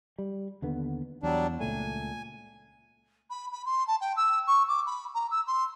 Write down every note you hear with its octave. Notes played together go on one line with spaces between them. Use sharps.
G3
D#2 D3 B3
E2 F#3 G3 D4
C#2 A#2 A3 G#5
B5
B5
C6
A5
G5
E6
C#6
D6
B5
A#5
E6
C6